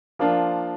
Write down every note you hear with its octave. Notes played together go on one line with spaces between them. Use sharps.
F3 A#3 D4 F4